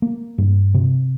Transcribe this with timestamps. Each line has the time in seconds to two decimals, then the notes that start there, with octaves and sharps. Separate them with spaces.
0.02 A#3
0.38 G2
0.74 C3